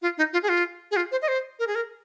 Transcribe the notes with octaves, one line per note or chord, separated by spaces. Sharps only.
F4
D#4
F4
G#4
F4
G#4
F4
C5
D#5
C5
A#4
G#4
A#4